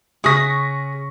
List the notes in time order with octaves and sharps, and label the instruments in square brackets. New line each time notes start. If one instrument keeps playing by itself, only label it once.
[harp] C#3 F#6 [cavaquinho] G#4 D#6 [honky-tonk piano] C#6 A#6 B6